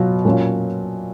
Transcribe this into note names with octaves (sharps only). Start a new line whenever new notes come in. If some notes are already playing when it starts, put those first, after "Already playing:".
Already playing: B2 F#3 B3 F4
A#2 F#3 C#4 F4